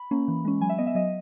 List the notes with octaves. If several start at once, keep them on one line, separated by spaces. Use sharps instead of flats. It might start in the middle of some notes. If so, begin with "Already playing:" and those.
Already playing: B5
A#3 C#4
E3
G#3 C#4
F#3 G#5
E5
B3 D#5
E5
F#3 D#5